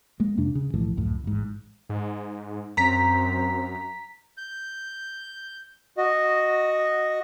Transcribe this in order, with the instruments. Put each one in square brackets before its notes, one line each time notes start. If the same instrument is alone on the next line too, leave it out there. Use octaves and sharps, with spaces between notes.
[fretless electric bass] G#3 A#3
F2 C3 D4
C#3
B1 A2 E3 F3
C#2 F#2 A2
A1 G#2
[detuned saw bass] G#2
[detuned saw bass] F#2 [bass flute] C4 [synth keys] A#5 B6
[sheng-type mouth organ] G6
F#4 D#5